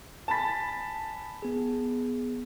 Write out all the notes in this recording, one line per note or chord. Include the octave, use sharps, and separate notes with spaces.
G#5 A5 B5 A6 B6
B3 G#4